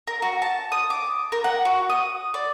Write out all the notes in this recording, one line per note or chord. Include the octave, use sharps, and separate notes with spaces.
A#4
F#4
A5
D#6
D6
A#4
F#5
F#4
D#6
D5